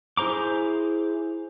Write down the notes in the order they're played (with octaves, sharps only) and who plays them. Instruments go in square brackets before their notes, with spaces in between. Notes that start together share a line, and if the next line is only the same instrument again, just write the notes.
[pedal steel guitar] E4 G#4 C5 A#5 D6